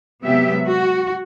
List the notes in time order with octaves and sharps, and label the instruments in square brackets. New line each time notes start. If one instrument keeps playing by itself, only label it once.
[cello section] C3 F#3 G#3 B3 G4 E5
F#4